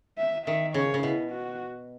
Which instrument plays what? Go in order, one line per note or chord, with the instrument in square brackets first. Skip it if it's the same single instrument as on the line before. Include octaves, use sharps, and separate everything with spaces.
[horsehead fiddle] E5
[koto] D#3 [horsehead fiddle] E5
[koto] C#3 [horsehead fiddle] C#5
[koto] C#3
[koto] B2 [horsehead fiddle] E4
[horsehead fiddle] F#4